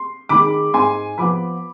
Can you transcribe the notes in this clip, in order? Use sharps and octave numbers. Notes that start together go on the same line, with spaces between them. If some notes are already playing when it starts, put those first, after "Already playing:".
Already playing: C6
D#3 G#3 B5 D6
G#2 G#5 C6
F3 B3 B5 D6